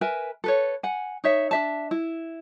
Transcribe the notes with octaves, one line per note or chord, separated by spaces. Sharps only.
A#4 B4 E5 G#5
A4 B4 C#5
F#5 G#5
D#4 C#5 E5
D4 E5 A5
E4